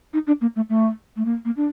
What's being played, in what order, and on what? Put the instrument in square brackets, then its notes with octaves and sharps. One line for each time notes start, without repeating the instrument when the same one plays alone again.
[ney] D#4
D4
A#3
A3
A3
A3
A#3
A#3
D4